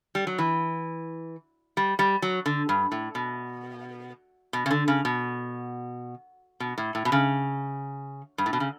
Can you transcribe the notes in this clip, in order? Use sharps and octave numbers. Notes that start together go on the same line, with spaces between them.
G3
F#3
E3
G3
G3
F#3
D3
G2
A2
B2
B2
C#3
D3
C#3
B2
B2
A2
A2
B2
C#3
G2
A2
B2
C#3